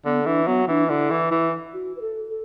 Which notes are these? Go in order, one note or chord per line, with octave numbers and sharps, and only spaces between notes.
D3 B3
E3 D4
F#3 B3
E3 D4
D3 E4
E3
E3
F#4
B4
A4
A4